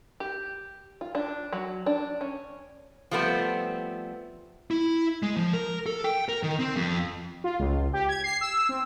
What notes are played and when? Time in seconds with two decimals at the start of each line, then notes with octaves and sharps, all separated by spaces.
0.20 G4
1.01 F4
1.15 D4
1.53 F#3
1.86 D4
2.21 C#4
3.11 F3 G3 A3 B3 C4
4.71 E4
5.23 G#3
5.36 F3
5.53 A#4
5.86 A4
6.04 G5
6.29 A#4
6.43 D#3
6.59 C4
6.76 F2
7.44 F4
7.59 C#2
7.93 G4
8.09 G#6
8.24 C7
8.41 E6
8.69 C4